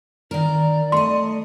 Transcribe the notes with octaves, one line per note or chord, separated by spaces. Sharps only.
D#3 A#4 D5
A3 D#5 C6